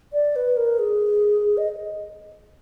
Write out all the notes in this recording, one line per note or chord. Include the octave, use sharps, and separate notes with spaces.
D5
B4
A#4
G#4
D#5